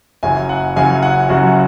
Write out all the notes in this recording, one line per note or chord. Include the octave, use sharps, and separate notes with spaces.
F#1 F#2 C#3 F#3 G#5
F#5
F#1 F#2 C#3 F#3 G#5
F#5
F#1 F#2 C#3 F#3 F#4